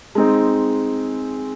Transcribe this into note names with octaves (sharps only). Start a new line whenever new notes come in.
G#3 C4 D#4